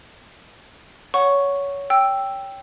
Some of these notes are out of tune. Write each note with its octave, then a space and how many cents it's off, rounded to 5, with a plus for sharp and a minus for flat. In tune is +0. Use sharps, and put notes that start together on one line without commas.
C#5 +20 F#5 -15 C#6 +0
G5 +0 E6 +5